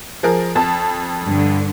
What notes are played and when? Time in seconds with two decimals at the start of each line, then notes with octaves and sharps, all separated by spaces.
0.23 F3 G#4 A#4
0.55 F2 A5
1.24 G2 D3